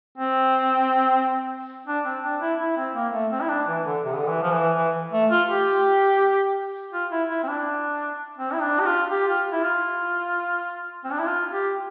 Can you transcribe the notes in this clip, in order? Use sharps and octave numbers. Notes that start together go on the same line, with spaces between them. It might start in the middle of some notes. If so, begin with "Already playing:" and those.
C4
D4
C4
D4
E4
E4
C4
A#3
A3
C4
E4
D4
E3
D3
C3
D3
E3
F3
E3
E3
A3
F4
G4
F4
E4
E4
C4
D4
C4
E4
D4
G4
F4
G4
F4
E4
F4
C4
D4
E4
F4
G4